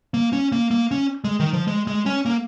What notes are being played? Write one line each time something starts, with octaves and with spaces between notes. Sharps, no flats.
A#3
C#4
A#3
A#3
C#4
G#3
D#3
F3
G#3
G#3
C#4
A#3